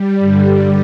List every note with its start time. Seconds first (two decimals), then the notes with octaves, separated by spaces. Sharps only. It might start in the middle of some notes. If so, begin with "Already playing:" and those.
Already playing: G3
0.19 G2 D3
0.47 G3